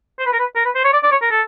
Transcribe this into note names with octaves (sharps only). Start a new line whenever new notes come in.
C5
B4
A#4
B4
A#4
B4
C5
C#5
D5
D5
C#5
A#4
A4